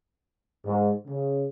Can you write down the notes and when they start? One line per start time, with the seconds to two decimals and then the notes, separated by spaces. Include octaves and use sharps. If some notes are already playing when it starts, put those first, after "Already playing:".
0.65 G#2
1.07 C#3